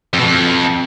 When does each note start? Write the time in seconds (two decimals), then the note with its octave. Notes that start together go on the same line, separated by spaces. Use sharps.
0.14 F2
0.19 B2
0.24 F2